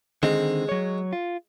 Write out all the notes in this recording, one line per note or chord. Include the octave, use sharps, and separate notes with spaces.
D3 D#3 G#3 C4
F#3 C#5
F4